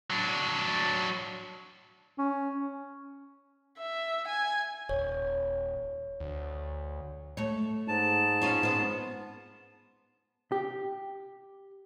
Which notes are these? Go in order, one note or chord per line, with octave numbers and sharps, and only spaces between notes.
F#3 D4
C#4
E5
G#5
D#1 C#5
D2
A3 C#5
G#2 A5
C#4 F4 C#5
B3 C5
G4